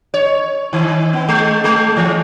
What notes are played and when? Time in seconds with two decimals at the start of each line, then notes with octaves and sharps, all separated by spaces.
0.14 C#5
0.73 D#3
1.13 B3
1.28 G#3
1.64 G#3
1.97 E3